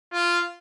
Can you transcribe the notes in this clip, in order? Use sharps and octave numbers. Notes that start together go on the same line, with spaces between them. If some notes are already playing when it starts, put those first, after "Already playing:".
F4